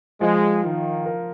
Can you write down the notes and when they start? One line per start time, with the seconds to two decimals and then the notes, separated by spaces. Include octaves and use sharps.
0.21 F3 G#3
0.64 D#3 F4
1.06 A#4